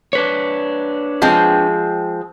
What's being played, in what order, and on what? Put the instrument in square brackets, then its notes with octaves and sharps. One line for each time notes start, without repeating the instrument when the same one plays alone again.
[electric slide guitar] D4 B4 C#5
[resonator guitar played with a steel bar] F3 G#3 C4